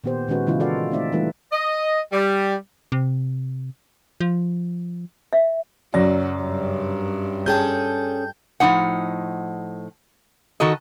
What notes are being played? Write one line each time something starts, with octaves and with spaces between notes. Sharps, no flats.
A#2 D#3 B3 G4 C5
A#2 D#3 G#3 C#4 F#4 B4
C#3 E3 G#3 C#4 E4 F4
F4 F#4 A4 D5 F5 F#5
A3 C4 D#4 D5 E5
E3 G3 A3 D#4 F4 B4
D#5
G3
C3
F3
E5
F#2 C#3 F#3 D5 A#6
G2
C#4 G#4 A4 G5 A5 G6
A2 F3 C4 D#4 F#5
D#3 F#4 A4 D#5